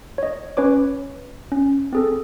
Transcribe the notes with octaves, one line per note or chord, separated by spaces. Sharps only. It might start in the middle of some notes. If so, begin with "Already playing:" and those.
C#5 D#5
C#4 B4 C#5 D6
C#4
C4 G#4 A4